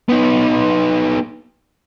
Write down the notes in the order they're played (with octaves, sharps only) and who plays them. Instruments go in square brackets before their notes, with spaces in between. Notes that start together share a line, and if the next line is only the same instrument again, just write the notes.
[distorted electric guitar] B3 D#4